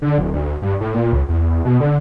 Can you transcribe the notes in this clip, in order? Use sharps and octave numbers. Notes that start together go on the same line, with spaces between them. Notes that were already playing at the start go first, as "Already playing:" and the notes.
D3
D1
D2
G2
A2
A#2
C#2
E2
B2
D3